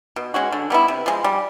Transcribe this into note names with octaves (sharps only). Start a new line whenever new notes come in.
B2
G#3 C#4 F#4
D3
G3 B3 E4
C3
F3 G#3
G3